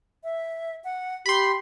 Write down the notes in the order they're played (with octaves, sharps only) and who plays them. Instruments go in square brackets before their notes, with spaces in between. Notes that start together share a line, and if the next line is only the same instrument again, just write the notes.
[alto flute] E5
F#5
[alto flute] G4 [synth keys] B5 C6